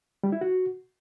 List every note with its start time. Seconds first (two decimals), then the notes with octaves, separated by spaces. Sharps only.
0.23 G3
0.32 E4
0.41 F#4